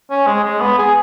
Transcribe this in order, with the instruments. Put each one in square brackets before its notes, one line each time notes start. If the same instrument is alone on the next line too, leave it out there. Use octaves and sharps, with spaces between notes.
[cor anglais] C#4
G#3
G#3
B3
G#4